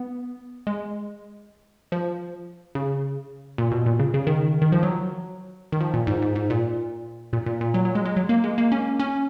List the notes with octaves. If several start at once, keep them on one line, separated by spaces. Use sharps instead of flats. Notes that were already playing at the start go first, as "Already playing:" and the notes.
Already playing: B3
G#3
F3
C#3
A#2
B2
A#2
C#3
C#3
D#3
D#3
F3
F#3
D#3
F3
A#2
G#2
G#2
G#2
A#2
A#2
A#2
A#2
F#3
F#3
G#3
G#3
F#3
A#3
G#3
A#3
C#4
C#4